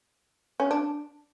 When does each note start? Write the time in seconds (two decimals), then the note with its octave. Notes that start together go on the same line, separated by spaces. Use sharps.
0.60 C#4
0.71 D4